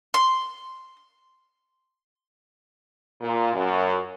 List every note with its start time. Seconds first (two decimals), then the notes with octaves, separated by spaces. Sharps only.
0.14 C6
3.21 A#2
3.53 F#2